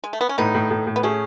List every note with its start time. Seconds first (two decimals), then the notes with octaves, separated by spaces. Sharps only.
0.04 G#3
0.13 A3
0.21 B3
0.29 C#4
0.38 A2 B3 D#4
0.54 A2
0.71 A2
0.87 A2
0.96 B3
1.03 A3 C#4 G#4